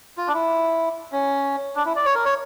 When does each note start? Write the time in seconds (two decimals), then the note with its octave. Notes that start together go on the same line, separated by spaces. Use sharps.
0.18 F4
0.28 D4
0.34 E4
1.12 C#4
1.76 D4
1.86 E4
1.96 D5
2.05 C#5
2.15 A#4
2.25 C#5